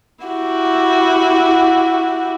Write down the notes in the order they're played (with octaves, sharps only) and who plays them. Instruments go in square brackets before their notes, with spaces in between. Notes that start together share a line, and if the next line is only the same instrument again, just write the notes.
[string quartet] E4 F#4 G4